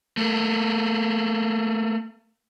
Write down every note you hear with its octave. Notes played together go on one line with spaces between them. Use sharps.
A3 A#3